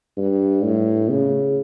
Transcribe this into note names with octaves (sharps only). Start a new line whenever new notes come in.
G2
A2
C#3